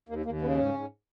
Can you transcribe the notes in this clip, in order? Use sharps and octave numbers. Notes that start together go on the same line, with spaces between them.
D#2 A#3
D#2 A#3
C#3 B3
G#2 C#4
G#2